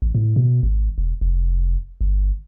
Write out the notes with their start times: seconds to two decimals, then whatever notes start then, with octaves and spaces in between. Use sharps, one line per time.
0.02 A1
0.15 A2
0.36 B2
0.63 G#1
0.98 E1
1.21 F1
2.01 G1